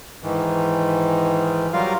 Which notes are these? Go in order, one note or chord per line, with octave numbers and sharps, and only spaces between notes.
G#2 D#3 E3
F#3 G3 F4 A#4 F5